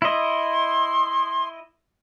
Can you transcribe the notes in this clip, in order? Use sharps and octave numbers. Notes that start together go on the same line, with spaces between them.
E4 D#5 C6